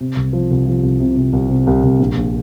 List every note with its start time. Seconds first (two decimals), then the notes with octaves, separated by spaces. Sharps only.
0.01 C3
0.16 C2
0.33 F3
0.51 C2
0.66 F3
0.83 C2
1.00 C3
1.17 C3
1.33 C2
1.49 C3
1.67 C2
1.83 C2
1.99 A#1
2.17 A#1